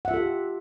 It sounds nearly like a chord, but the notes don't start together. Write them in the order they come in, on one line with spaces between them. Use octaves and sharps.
F#5 E5 F4 A4 G4